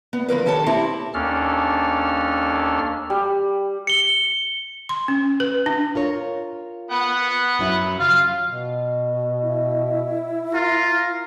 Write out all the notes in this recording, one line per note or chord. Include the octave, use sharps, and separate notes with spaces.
B3
D3 F3 A#4 B4
D#3 G4 A4 C#5 A5
C4 E4 G4 C#5
D#2 C#4 D4 A4 F6
G3
C#7 G7
C6
C#4
B4
D4
F4 A#4 C#5
B3 F#5
F#2 F#3 E4
C#3 F#3 F4 F5
B2
E4
F4 A#4